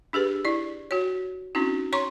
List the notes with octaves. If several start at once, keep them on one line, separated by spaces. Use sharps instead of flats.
D4 G4 G#4 B4
E4 D5
F#4 C#5
C4 C#4 D#4 E4 F#4
C#5 A#5 C6 C#6